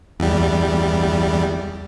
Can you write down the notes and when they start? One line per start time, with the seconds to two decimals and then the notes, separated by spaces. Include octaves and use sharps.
0.20 E2 G3